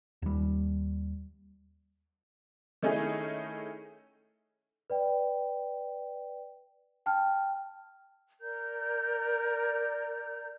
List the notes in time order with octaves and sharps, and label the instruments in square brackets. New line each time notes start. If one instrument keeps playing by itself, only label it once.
[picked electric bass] D#2 G3
[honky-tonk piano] D#3 A3 C#4 D#4 E4 G#4
[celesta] B4 D5 G5
G5 A5 F6
[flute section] A#4 D5 A#5 G6